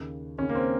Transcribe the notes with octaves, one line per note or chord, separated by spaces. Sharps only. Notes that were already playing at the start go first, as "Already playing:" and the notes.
Already playing: D#2 C#3
D#2 C#3 C#4
A#3
C4